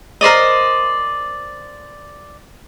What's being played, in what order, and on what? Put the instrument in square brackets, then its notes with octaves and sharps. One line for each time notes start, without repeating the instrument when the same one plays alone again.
[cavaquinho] A#4 C5 D5 D#5